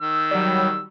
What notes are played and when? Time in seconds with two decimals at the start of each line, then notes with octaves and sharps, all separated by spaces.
0.01 D#3 E6
0.31 F#3 G3